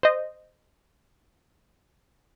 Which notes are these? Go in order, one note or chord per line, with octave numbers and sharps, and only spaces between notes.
C5 D#5